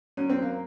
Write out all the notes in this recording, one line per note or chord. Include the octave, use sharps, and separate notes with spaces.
F#2 C#4
C4
A#3